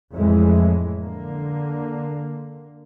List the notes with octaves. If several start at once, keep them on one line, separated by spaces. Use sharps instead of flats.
F2 A2 E3 G#3
D3 A#3